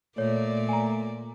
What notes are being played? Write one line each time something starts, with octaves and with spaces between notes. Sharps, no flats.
A#2 A3 A#3 C#5 D5
G#5 A#5